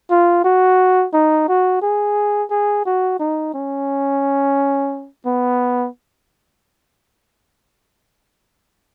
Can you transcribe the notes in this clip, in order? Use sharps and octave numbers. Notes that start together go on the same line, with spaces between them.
F4
F#4
D#4
F#4
G#4
G#4
F#4
D#4
C#4
B3